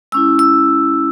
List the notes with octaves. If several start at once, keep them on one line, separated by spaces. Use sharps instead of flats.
G#3 C#4 E4 E6
E6